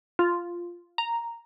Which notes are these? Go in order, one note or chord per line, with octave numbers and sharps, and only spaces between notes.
F4
A#5